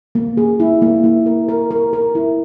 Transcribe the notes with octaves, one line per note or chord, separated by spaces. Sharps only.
A#3
G#4
E4
A#3
E4
A#4
A#4
A#4
A#4
E4